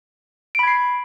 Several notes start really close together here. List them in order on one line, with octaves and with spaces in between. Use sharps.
D7 B5 G#6 C7